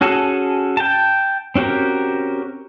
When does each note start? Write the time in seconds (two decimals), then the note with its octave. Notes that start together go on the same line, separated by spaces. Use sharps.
0.01 C#4 F#4 G#4 A4
0.77 G5 A5
1.56 C4 C#4 F#4 G4 A#4